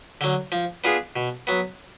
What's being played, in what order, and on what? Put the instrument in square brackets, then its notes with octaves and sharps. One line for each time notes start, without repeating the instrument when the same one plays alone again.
[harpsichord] D3 F#3
F3
B3 D4 F4 G#4
B2
F#3 B3